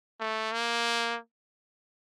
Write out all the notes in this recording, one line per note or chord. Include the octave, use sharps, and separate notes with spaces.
A3
A#3